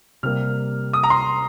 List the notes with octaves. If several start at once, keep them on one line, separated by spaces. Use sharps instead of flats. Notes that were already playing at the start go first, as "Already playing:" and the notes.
C3 G3 A#3 F6
D#6
A#5
C6